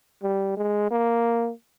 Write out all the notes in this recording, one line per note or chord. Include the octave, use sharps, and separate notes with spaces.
G3
G#3
A#3